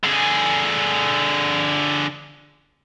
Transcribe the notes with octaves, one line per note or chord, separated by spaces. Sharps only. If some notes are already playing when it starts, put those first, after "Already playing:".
D3 G#4